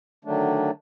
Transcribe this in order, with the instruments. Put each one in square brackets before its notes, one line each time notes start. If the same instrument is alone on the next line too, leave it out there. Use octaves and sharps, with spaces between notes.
[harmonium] D3 D#3 F#3 A3 D4